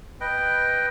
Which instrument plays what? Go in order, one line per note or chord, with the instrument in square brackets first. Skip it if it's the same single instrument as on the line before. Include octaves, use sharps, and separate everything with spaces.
[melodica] B4 D#5 G5